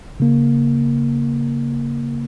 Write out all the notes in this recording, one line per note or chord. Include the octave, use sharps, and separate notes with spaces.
C#3 A#3